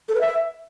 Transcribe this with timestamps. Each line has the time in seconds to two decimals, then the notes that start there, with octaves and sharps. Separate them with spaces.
0.08 A4
0.15 B4
0.21 E5